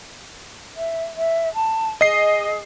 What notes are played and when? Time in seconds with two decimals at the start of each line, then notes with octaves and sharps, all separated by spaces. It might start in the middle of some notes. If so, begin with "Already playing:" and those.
0.76 E5
1.16 E5
1.54 A5
2.01 G#4 D#5 C7